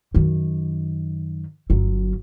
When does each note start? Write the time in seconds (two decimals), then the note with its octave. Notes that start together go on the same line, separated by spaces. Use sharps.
0.14 F#2 D#3
1.70 G1 F#3